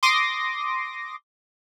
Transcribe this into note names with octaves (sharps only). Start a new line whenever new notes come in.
C6 D6 D#6 A#6